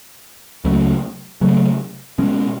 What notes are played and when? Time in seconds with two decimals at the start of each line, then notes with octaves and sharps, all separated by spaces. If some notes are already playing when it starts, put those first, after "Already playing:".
0.65 C#2 C#3 F#3 A3
1.41 C#3 F#3 A3
2.18 B2 G#3 C#4